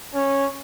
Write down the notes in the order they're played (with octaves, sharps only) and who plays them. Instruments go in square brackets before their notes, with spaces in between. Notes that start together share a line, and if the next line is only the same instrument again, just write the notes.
[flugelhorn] C#4